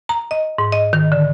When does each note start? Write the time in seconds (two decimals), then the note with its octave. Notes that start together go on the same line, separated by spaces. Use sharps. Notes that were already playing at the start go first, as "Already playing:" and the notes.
0.09 A#5
0.31 D#5
0.58 G#2
0.72 D#5
0.93 D#3
1.12 D3